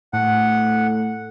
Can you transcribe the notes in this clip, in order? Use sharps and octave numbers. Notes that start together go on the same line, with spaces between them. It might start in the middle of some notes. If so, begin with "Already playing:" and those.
A2 F#5